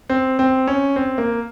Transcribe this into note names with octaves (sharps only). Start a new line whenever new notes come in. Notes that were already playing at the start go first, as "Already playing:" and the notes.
C4
C4
C#4
C4
A#3